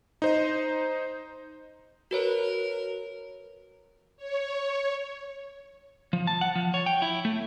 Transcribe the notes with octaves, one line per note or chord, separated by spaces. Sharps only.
D#4 C5 D#5
F#4 A#4 B4 C#5
C#5
F3
A5
F#5
F3
C#5
G5
E4
A3